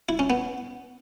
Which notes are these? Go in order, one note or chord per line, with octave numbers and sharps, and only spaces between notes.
E4
C#4
B3